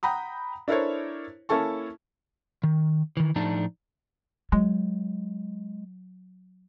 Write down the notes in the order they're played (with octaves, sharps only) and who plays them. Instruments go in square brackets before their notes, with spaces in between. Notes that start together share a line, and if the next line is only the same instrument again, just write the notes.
[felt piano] F#5 G5 A#5 B5 D#6
D4 E4 A4 A#4 C5 C#5
A#3 C#4 E4 A4 A5 C#6
[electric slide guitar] D#3
D#3 E3
A2 F3 A3 D4 D#4 A5
[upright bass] F#3 [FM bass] G#3